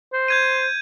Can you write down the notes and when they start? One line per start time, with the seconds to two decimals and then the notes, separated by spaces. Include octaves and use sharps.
0.13 C5
0.28 G6 G#6 D#7